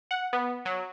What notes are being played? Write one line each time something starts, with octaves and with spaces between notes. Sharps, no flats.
F#5
B3
F#3